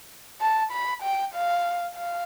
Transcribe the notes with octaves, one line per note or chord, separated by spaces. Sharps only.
A5
B5
G5
F5
F5